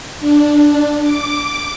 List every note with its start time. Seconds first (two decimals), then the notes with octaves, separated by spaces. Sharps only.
0.19 D4
1.02 D6